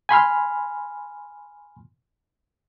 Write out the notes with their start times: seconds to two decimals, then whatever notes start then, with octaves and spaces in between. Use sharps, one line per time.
0.09 G#5 B5 C6 F6